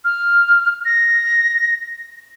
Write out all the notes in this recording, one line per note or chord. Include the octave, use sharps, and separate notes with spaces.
F6
A#6